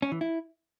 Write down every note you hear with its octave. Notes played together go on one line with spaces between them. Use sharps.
C#4
E3
E4